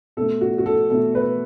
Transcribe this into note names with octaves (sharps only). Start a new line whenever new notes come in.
B2 A3 A4
F#4
F#4
A4
B2 A3 A4
B4